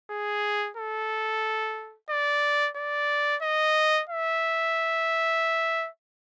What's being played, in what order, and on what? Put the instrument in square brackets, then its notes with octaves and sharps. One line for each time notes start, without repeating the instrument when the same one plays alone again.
[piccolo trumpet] G#4
A4
D5
D5
D#5
E5